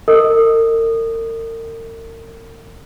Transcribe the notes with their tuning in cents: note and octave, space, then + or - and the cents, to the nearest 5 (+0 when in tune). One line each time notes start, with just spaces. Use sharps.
A#4 -40 D#5 +0 D#6 -20